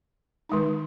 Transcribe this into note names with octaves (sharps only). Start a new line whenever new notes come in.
D#3 G#3 D#4